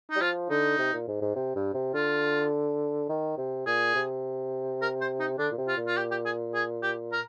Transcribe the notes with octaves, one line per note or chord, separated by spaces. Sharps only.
D#4
G3
F3 F4
D3 D#4
C3
A#2
G#2
G#2
C3
G2
C3
D3 F4
D#3
C3
A#2 G#4
C3
A#4
C5
D#4
D3 D4
A#2
C3
F4
A#2
F4
G4
G4
G#4
G#4
G4
A#4